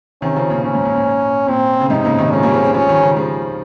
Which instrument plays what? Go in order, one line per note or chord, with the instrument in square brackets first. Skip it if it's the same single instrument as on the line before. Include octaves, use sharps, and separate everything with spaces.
[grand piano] C3 D#3 [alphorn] C#4
[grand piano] C#3 F3
A#2 C#3
[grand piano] A#2 [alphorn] C#4
[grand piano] G#2
A#2
A#2
[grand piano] A#2 [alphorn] C4
[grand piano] C#3
[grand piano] G#2 C3 [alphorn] D#4
[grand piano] A#2 C#3
C3 D#3
[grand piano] F3 G#3 [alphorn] C#4
[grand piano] G3 A#3
G#3 C4
G#3 C4
[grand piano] F3 G#3 [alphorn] C#4
[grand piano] D#3 G3
C#3 F3
F3 G#3